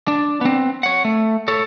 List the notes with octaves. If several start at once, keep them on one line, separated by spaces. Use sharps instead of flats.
D4
B3 C4
C#5 F#5
A3
A4 C#5